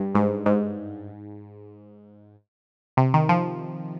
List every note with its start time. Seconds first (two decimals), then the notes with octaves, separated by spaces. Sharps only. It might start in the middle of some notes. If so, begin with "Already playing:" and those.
Already playing: G2
0.15 G#2
0.46 G#2
2.97 C3
3.14 D#3
3.29 F3